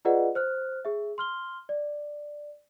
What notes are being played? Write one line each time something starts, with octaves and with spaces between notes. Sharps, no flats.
F4 G#4 B4 D5 D#5 F#5
C5 F6 F#6
G#4 E5
C6 F6 G7
D5